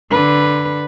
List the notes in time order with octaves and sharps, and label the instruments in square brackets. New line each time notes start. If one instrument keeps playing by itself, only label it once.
[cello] D3 B4